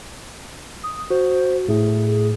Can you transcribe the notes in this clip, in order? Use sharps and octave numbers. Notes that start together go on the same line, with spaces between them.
D#6
F#4 C5
A2 A3 G#4